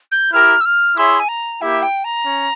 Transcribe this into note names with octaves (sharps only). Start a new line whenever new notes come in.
G6
E4 G4 A#4 F6
E6
F6
E4 G#4 C#5 E5 C6
G#5
A#5
A#3 E4 G4 E5
G5
A#5
C#4